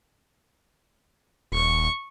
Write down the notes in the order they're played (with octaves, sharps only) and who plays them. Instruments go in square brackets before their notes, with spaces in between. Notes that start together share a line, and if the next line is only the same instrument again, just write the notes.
[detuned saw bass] D#1 [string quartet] C#6